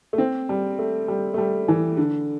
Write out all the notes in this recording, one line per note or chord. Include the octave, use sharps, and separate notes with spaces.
A3
C4
G3
A3
G3
A3
G3
E3
D3